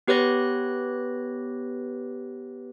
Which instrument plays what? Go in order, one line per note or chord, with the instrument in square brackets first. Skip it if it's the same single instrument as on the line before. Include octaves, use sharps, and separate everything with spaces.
[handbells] B3 G4 B4 C#5 F#6 A#6